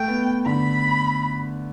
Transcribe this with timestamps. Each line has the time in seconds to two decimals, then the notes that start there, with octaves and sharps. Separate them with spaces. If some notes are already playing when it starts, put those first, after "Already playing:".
Already playing: A3 G5
0.08 B3
0.46 D3 B5